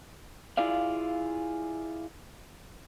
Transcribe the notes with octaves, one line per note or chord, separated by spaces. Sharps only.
E4 F4 G#4 D5 F5